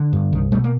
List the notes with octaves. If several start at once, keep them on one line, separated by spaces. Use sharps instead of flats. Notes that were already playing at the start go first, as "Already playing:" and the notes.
Already playing: D3
G2
C2 D#3
B2 G3 A3
A#3